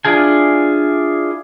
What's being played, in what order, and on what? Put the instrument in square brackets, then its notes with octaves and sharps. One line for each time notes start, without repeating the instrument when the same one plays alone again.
[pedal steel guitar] D4 E4 F4 G#4 G#5